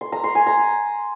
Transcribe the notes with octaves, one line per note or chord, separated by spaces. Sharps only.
C6
A#5
C6
G#5
A#5